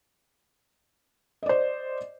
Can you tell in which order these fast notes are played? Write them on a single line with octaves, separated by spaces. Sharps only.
D#5 D5 C5